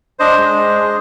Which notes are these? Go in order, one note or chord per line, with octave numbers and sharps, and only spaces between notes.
D4 C5 D#5
G#3
D4
G#4